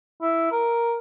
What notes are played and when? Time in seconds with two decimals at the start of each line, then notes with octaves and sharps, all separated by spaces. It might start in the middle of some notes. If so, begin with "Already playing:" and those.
0.21 E4
0.52 A#4